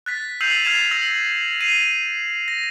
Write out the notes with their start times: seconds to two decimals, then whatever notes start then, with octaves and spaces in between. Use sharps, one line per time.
0.06 F#6 A6 B6
0.41 E6 G6 C7 D#7 F7 F#7
0.65 F6 G#6 A6 C7 E7 F7
0.91 E6 A#6 F#7
1.60 C7 D#7 F7
2.48 A#6